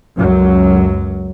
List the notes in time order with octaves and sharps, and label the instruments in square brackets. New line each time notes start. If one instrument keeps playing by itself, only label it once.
[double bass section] C#2 F#2 F#3